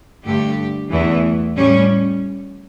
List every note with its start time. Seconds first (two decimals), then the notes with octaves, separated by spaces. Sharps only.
0.25 G2 D3 A3 G4
0.91 E2 E3 A3
1.56 A2 G3 C#4